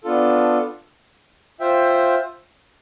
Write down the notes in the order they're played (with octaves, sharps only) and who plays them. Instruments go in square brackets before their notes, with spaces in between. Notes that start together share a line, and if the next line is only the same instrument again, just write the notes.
[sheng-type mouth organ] B3 D4 F4 A4
F4 C5 E5 G5